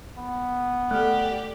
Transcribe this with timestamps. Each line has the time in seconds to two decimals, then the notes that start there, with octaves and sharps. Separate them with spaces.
0.17 B3
0.91 A3 G4 D5 F#5 F6 F#6